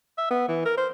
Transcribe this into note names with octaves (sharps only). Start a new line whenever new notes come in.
E5
B3
E3
A#4
C5